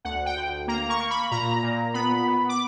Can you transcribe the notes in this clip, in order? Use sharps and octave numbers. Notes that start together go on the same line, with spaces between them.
D2 F#5
G5
D2
A#3 A#5
C#6
A#3
B5
A#2 A#5
A#2
B3 B5
B3
D6